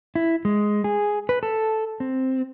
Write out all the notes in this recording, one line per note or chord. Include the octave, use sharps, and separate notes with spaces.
E4
G#3
G#4
B4
A4
C4